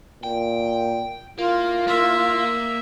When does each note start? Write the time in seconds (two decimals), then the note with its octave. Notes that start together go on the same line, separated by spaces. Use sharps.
0.23 A#2 G5
1.38 A#3 E4 F4
1.88 A#3 E5